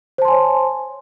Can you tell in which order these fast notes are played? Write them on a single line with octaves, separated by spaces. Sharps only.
C5 A5 C6 G#5 C#5